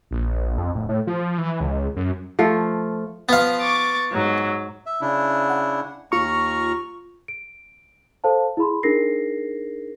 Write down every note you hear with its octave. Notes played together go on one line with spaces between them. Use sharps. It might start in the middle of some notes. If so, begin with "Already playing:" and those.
A#1
F2
D1
A2
F3
E3
C#2
F#2
F3 A3 F4
F3 B3 F5
C#6 D6 A6
G#2 F#3
E5
C#3 D4 E4
F#5
D#2 F4 A#5 C#6 F6
D7
A4 C5 F5 A5
E4 G#4 B5 C6
D4 D#4 G#4 A#4 A#6 C7